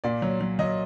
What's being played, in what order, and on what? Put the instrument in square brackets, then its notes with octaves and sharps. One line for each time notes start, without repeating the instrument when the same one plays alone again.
[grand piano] A#2 D5
F#3
F#3
F#3 D#5